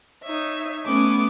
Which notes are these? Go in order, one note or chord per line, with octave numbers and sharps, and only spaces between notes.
D#4 C#5 E5
A3 B3 C#4 D6